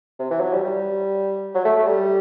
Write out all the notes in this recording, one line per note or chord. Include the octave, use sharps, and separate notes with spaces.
C3
E3
F#3
G3
G3
F#3
A3
A3
G3